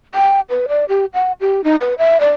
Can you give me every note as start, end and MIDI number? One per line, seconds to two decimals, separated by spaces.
0.15 0.40 79
0.50 0.66 71
0.69 0.85 74
0.89 1.05 67
1.14 1.32 78
1.41 1.63 67
1.64 1.75 63
1.81 1.94 71
1.98 2.20 76
2.20 2.30 74